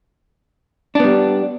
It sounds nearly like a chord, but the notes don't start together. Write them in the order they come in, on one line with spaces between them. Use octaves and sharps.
D4 B3 G3